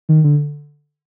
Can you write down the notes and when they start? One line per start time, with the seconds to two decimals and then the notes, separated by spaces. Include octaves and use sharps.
0.09 D#3
0.24 D3